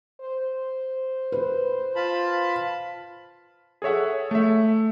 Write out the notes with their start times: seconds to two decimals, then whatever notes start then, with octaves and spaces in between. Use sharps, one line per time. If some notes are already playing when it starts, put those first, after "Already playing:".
0.21 C5
1.32 B4
1.96 F4 A5 B5
3.82 G#4 A4 C#5 E5 F#5
4.31 A3 E5